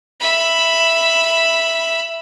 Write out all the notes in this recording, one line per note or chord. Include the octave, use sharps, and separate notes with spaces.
E5 B5